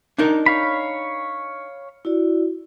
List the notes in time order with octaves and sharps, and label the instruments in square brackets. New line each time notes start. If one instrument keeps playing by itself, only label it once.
[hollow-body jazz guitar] D4 D#4 A#4
[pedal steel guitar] C#5 F5 B5
[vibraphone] E4 F#4 D5